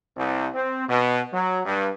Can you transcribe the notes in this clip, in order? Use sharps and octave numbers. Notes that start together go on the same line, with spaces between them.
C2
C4
B2
F#3
G2